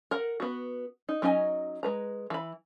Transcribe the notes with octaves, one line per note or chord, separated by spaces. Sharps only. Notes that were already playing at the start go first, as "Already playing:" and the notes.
A#4 F#5
B3 F#4
D#4
F#3 C#4 D#4 D#5 G#5
G#3 B4 A#5
E3 B5